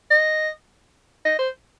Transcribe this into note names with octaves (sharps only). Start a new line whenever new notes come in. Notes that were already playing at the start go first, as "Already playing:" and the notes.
D#5
D#5
C5